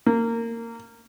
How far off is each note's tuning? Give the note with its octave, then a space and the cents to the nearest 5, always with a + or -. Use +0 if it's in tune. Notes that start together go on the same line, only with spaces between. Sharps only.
A#3 -20